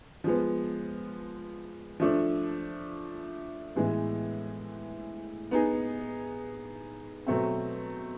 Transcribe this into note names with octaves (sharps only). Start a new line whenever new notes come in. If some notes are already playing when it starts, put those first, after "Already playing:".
F3 G#3 B3
F3 A3 D4
A2 E3 G#3 B3
B3 D#4 G#4
B2 F#3 A3 C4